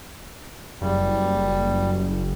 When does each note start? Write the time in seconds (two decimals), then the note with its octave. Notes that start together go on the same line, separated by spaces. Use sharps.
0.82 F#1 G3